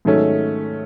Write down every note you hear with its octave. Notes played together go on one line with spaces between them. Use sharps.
G#2 D#3 F#3 A3 C#4